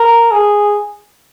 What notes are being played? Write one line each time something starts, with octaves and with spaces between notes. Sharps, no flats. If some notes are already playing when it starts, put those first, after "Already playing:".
Already playing: A#4
G#4